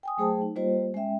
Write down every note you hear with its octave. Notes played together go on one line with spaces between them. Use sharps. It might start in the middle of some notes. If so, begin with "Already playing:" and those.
G5 G#5 D#6
F#3 A3 G#4 C5 G5 A5
D#4
G3 A#3 F4 G4 C5 D#5
G#3 C#4 E5 G5